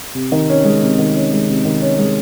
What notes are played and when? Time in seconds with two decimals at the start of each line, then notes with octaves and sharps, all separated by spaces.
0.15 C3
0.32 D#3
0.49 C#4
0.65 G#3
0.82 C3
0.99 D#3
1.16 C#4
1.32 G#3
1.48 C3
1.65 D#3
1.82 C#4
1.99 G#3